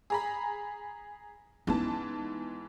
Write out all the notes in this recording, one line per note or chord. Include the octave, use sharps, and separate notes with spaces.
G#4 A#5 B5
G#2 E3 B3 C#4 A5